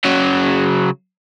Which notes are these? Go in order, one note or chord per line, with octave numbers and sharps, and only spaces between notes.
C#3 F#3